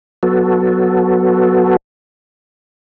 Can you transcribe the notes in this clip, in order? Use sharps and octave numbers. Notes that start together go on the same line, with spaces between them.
F#3 B3 F#4 A4